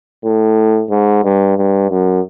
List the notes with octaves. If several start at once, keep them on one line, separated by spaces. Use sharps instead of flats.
A2
G#2
G2
G2
F#2